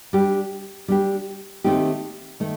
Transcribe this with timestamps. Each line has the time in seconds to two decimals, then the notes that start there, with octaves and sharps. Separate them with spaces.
0.13 G3 D4 G4
0.88 G3 D4 G4
1.64 D#3 A3 C4 D#4 G4
2.40 D#3 A3